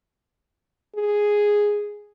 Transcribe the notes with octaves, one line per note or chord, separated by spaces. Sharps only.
G#4